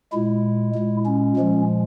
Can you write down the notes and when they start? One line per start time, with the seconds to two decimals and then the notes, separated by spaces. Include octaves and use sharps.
0.12 A#2 G#3 E4
0.75 A#2 G#3
1.05 C#4
1.37 A#2 F3 G#3